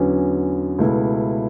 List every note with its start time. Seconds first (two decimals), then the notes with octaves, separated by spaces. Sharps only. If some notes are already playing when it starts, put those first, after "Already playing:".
Already playing: E2 D3 F#3 C#4
0.79 C#2 B2 A3 E4